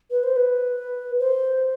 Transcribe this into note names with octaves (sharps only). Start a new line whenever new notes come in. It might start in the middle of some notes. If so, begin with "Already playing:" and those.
B4
C5
B4
C5